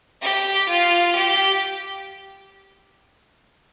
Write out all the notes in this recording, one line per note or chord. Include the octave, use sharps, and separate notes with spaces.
G4
F4
G4